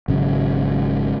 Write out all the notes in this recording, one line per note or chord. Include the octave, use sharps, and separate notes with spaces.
G#1 C#3 F#3